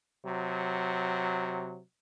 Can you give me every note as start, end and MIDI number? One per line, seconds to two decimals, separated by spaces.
0.24 1.79 48
0.24 1.79 54